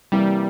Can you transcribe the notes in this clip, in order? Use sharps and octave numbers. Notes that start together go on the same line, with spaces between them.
C3 E3 G3 A#3 E4 G4